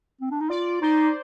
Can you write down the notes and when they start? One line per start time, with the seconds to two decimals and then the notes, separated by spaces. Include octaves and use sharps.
0.21 C4
0.31 D4
0.41 D#4
0.50 F4 D5
0.81 D#4 C5